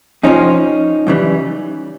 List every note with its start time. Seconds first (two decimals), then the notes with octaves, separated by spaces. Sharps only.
0.23 F2 C3 F3 C#4 D#4
1.07 F#2 C#3 E3 G3